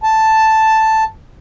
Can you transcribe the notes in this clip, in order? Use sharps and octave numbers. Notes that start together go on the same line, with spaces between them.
A5